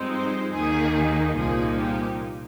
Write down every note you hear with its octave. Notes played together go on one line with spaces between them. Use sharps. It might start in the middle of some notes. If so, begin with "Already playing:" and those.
Already playing: G2 F3 G#3 C4 D#4
C5
D#2 D#3 A#3 D#4 G#4
C2 A#2 F3 A#3 D#4 G#4
G4